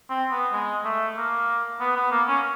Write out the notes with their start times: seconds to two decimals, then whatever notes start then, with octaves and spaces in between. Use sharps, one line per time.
0.10 C4
0.31 B3
0.53 G#3
0.84 A3
1.17 A#3
1.80 B3
1.96 B3
2.11 A#3
2.28 C#4